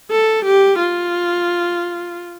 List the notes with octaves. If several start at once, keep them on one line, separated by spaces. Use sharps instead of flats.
A4
G4
F4